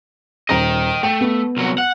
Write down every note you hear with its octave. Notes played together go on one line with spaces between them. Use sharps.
D#1 D#5 G5 A#5 A#6
A3 G5
B3
C2 F#3
F#5